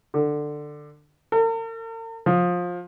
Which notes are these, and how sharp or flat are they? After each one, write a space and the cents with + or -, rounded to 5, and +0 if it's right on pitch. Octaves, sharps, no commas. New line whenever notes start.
D3 +20
A#4 -45
F3 +20